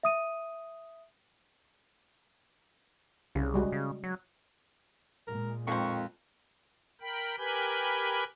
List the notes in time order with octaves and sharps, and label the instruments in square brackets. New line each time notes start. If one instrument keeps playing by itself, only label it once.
[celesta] E5 D#6 D#7
[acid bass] C2 [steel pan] C#3
[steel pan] G3 G#3 F#4
[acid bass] C#3
F#3
[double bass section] A#2 G#3 [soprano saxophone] A#4
[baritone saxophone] F2 [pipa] D#3 C5 [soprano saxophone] C#6
[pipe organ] A#4 G5 B5
G4 A#4 B4 G#5 B5 G6